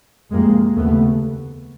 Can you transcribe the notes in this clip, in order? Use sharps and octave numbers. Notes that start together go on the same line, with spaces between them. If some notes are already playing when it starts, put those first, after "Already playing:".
F2 C3 G#3 A#3
D#2 C#3 A3 B3